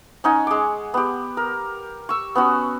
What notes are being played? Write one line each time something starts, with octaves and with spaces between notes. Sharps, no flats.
C#4 D#4 F#5 G#5
G#3 D6
B3 G4
A#4
C#6 E6
B3 C#4 F#4